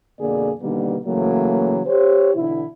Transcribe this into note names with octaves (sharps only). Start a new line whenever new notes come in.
F2 B2 D3 A#3 G#4 D5
B2 D3 D#3 G3 A#3 B3
C#3 E3 F#3 A3 A#3
G4 C5 C#5
B2 D3 E3 E4